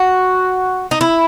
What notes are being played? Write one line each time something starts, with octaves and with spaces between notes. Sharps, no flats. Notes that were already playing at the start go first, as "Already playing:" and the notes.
Already playing: F#4
D#4
E4